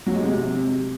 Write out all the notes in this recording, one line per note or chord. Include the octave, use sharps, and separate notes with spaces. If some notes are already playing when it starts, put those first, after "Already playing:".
F#3
G#3
C3